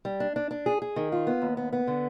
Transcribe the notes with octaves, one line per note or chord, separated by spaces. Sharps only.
G3
D4
D4
D4
G#4
G#4
D#3
F4
B3
D#2
B3
B3
D3